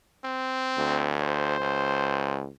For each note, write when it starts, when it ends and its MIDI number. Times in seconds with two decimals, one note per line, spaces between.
0.25 1.15 60
0.78 1.57 38
1.21 2.41 72
1.60 2.49 37